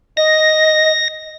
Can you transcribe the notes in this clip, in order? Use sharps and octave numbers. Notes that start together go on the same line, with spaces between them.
D#5 A#6